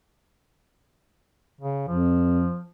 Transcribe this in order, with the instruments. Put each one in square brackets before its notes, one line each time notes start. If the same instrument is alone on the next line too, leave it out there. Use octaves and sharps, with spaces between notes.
[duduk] C#3
[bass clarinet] F2 [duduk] F3